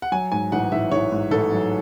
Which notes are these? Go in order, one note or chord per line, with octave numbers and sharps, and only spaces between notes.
F#5
F#3 G#5
G#2 G#5
A1 F#5
A1 E5
A1 C#5
G#2
A1 A4
F#3